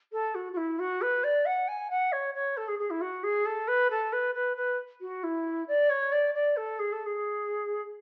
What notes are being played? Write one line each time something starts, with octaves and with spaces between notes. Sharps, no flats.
A4
F#4
F#4
E4
F#4
B4
D5
F#5
G#5
F#5
C#5
C#5
A4
G#4
G#4
E4
F#4
G#4
A4
B4
A4
B4
B4
B4
F#4
E4
D5
C#5
D5
D5
A4
G#4
A4
G#4